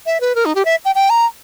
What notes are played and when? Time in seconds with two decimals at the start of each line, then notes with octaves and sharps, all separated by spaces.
0.06 E5
0.21 B4
0.35 A#4
0.45 D#4
0.55 G4
0.65 E5
0.85 G5
0.95 G5
1.10 A#5